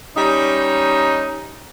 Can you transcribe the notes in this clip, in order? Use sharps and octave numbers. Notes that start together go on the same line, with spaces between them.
G3 C#4 D#4